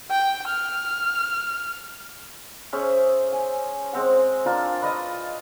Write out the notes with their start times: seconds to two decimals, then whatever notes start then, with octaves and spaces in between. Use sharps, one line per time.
0.10 G5
0.48 F6
2.73 C#4 G#4 C5 E5
3.32 G#5
3.93 G#3 C4 F#5
4.46 D4 F4 A#4
4.82 B4 D5 D#5 D#6